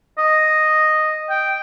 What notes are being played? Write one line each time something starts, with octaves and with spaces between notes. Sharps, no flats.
D#5
G5